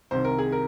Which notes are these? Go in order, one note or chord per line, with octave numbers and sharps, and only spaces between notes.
C2 C3 D#3 C5
A#4
G#4
A#4